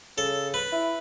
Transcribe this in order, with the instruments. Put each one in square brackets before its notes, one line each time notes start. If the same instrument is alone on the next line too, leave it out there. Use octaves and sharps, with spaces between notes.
[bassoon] C#3 [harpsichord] A4
[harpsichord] B4
[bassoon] E4